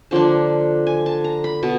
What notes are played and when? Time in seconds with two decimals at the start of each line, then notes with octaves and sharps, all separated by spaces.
0.11 D3 F3 A#3 D4 A5
0.87 G#5
1.06 A5
1.24 A#5
1.44 B5
1.63 B2 A5